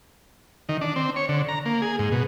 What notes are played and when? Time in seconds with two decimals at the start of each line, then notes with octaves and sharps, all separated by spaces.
0.69 D#3
0.81 D4
0.96 C4
1.16 C#5
1.29 D3
1.48 A#5
1.65 A#3
1.82 G#4
1.99 G#2
2.12 B2